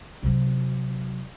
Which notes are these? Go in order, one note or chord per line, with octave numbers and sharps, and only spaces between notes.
C3 F#3